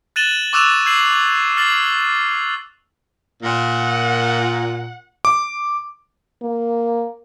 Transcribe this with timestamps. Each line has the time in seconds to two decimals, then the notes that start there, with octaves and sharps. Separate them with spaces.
0.16 F#6 A6 D#7 E7 F#7 G7
0.53 C#6 D6 E6 F#6 E7 F7
0.85 E6 G#6 C7 F#7
1.57 F6 A6 C7 F#7
3.43 A#2 F#5
5.25 D6
6.42 A#3